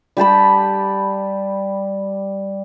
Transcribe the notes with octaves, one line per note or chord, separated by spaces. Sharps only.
G3 G4 A5 B5